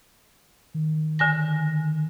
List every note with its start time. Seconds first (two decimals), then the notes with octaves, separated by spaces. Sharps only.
0.74 D#3
1.19 D3 G#5 A#6